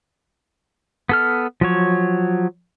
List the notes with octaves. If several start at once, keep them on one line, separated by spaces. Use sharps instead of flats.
B3 A4 F6
F3 F#3 C#5